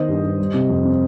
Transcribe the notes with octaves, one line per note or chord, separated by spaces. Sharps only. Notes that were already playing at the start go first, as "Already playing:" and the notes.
Already playing: D#3 B3 C5 D#5
G2
G2
G3
C3
F2
C4